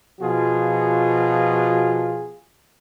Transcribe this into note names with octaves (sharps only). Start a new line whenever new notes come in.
B2 F3 F4 F#4 G#4